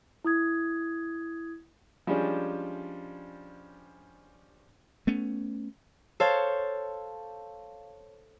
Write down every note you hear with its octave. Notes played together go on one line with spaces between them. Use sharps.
E4 D#6 G#6
F3 G3 G#3 C#4 D4
A3 B3 C#4
A4 C5 C#5 F5